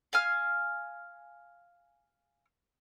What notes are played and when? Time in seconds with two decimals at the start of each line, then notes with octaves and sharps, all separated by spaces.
0.13 F5 G#5 F6